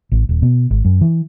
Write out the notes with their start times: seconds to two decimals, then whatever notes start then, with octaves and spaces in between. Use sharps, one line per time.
0.12 A1
0.29 D#1
0.42 B2
0.71 G#1
0.85 F#2
1.01 E3